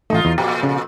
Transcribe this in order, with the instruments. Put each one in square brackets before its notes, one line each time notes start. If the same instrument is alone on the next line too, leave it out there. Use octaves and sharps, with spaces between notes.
[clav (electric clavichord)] A1 A3 [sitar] D#4 F4
[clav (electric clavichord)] E2
[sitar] F2 A#2 [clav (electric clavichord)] G4 A#5
[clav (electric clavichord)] C#3